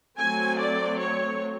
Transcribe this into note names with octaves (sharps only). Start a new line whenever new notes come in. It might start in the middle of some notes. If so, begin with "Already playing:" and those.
F#3 A3 C4 G#5
D5
C#5